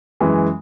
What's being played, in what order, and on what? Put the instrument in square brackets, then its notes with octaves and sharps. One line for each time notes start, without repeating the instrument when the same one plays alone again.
[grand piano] F#2 E3 G#3